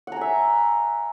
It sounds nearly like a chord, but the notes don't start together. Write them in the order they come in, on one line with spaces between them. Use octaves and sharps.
F#5 A#5 G#5 E5